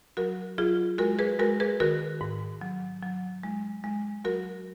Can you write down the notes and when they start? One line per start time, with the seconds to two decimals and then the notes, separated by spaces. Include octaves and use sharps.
0.17 F#3 F#4 A#4
0.58 F#3 F4 G#4
0.98 G#3 F#4 A#4
1.19 G#4 B4
1.39 G#3 F#4 A#4
1.60 G#4 B4
1.80 D#3 F#4 A#4
2.21 G#2
2.61 F#3
3.03 F#3
3.43 G#3
3.84 G#3
4.24 F#3 F#4 A#4